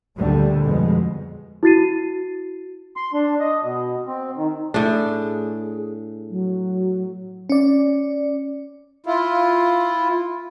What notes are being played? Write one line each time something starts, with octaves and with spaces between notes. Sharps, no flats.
D2 A#2 D3 G3
F2 B2 G#3
E4 F#4 A6 C7 D#7
C6
D4
D#5
B2
C4
D#3
A2 D4 G#4
F#3
C#4 D5
E4 F4